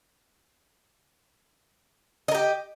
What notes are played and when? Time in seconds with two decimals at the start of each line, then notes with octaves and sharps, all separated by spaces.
2.28 D#5
2.31 A#4
2.34 G4